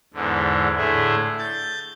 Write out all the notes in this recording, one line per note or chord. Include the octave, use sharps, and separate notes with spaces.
E2 G#2 D3
A2 D3 A3 E4 G#4
G6 A6